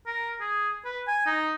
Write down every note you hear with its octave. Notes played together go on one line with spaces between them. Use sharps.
A#4
G#4
B4
G#5
D#4